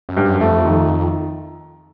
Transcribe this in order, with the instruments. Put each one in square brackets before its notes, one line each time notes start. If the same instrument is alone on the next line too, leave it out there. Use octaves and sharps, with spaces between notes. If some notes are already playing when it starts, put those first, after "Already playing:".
[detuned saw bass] F#2
[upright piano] G2
[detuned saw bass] F#2
[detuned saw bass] F2 [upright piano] A3
[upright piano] D#3